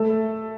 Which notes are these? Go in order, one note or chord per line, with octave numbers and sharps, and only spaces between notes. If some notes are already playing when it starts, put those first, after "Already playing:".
Already playing: A3 A4